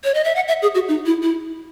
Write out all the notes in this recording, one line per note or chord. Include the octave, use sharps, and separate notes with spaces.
C#5
D#5
E5
F#5
E5
G#4
F#4
D#4
E4
E4